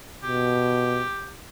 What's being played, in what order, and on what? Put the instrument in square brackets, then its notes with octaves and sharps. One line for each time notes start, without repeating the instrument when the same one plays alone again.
[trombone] B2 [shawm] G4